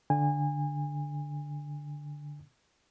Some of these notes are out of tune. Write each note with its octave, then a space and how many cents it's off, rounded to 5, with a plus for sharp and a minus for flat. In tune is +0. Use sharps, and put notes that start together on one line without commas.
D3 +0 G#5 -30